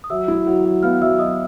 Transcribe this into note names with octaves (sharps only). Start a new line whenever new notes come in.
D#6
F#3 E5 E6
E4
F#3
F#3
B3 F5 F6
F#3 E5 E6
F#3 D#5 D#6